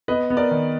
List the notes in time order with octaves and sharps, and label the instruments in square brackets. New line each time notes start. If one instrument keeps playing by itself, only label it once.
[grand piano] B3 B4 D#5
B3
A#4 D5
D#3